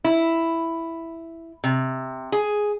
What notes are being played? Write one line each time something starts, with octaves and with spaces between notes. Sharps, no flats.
E4
C3
G#4